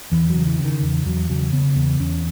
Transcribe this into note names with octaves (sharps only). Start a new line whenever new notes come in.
E2 E3
F#3
C#3
E3
C#3
D#3
E2
E3
E2 F#3
C#3 F#3
C#3 B3
E2 B3
E2 C#4